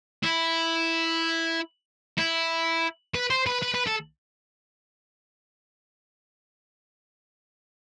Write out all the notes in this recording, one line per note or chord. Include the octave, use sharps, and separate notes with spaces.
E4
E4
B4
C5
B4
B4
B4
A4